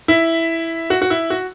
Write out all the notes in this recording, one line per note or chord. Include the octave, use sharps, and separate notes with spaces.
E4
F#4
F#4
E4
F#4